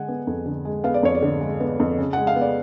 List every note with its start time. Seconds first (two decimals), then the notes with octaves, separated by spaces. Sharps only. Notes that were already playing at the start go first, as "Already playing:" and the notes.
Already playing: D3 G#3 F#5 G#5
0.08 B3
0.27 F2
0.46 D3
0.65 G#3
0.84 B3 F5
0.94 D5
1.03 F2 C#5
1.15 D5
1.22 D3
1.41 G#3
1.60 B3
1.80 F2
1.98 C#3
2.13 F#5
2.17 G#3
2.27 F5
2.36 B3
2.41 D5